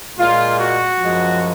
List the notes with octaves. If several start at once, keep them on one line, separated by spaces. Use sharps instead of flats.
A#2 G#3 F4
F#4
F#2 F3 G#3